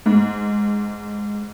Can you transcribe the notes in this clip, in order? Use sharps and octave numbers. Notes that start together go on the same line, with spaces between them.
G#2